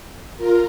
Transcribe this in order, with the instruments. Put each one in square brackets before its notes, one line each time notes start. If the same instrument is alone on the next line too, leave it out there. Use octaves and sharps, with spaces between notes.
[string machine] F4 A#4